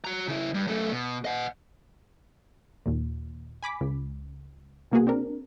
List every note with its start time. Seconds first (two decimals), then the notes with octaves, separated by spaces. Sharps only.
0.04 F#4 A#5
0.28 C#3 E4
0.54 G2
0.67 F#2 A3
0.92 B2
1.25 D#5 F#5
2.86 D#2 A#2
3.63 G#5 B5 D6 B6
3.81 C#2
4.91 C2 B2 A#3 B3 F#4 G#4
5.07 C4 D4 A#4